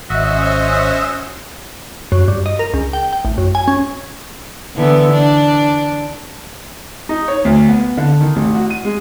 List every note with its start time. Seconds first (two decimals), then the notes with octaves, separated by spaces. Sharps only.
0.10 G#1 C#4 F#4 C5 D#5 E5
2.12 F#2
2.28 G2
2.46 D#5
2.59 A#4
2.74 C#2
2.93 G5
3.13 G5
3.25 A1
3.38 F#2
3.55 G#5
3.68 C#4
4.76 D3 E3 B3
5.12 D4
7.09 D#4
7.28 C#5
7.45 D2
7.69 B3
7.97 D3
8.21 D#3
8.36 A1
8.55 F#4
8.70 D#7
8.85 G#3